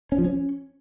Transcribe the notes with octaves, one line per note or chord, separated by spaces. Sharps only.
C#4
F3
C#4